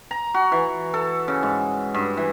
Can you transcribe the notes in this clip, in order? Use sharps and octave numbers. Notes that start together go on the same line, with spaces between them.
A#5
F#4
E3
A4
C#3
G#2
G2
E3